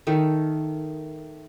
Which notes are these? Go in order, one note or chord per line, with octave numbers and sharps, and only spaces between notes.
D#3 A3